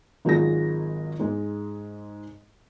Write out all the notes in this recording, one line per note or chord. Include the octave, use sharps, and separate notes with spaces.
G#1 F#3 G#3 F4 G#4 A#6
G#2 G#3